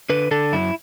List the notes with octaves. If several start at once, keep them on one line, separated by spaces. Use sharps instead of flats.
D3 B4
D3 A4
F#2 E4